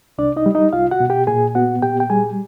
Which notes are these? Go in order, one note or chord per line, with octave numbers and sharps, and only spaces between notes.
C2 D4 D5
D#4 D#5
G3
D#4 D#5
C2 F4 F5
F#4 F#5
B2
G4 G5
A#2 G#4 G#5
B3 F#4 F#5
A#2 G4 G5
G5
G3 G#4 G#5